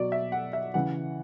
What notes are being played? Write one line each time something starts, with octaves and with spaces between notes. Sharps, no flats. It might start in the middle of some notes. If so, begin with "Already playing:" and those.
Already playing: B2 F#3 D5
E5
F#5
E5
C#3 E3 F#5